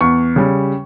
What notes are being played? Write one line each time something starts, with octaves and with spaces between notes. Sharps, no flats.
E2 C#6
C#3 G3